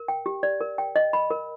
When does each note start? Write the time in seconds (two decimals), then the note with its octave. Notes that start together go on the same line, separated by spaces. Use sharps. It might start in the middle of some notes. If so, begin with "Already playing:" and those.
Already playing: A#4
0.08 G5
0.26 G4
0.43 D5
0.61 A#4
0.78 G5
0.96 D#5
1.13 B5
1.31 A#4